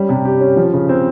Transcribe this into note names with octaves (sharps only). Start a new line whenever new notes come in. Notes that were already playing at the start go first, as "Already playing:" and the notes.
Already playing: G3 C#4
C3
G4
C#4
F3
C#3
C4